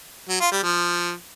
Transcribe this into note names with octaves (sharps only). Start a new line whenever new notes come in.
F#3
F4
G3
F3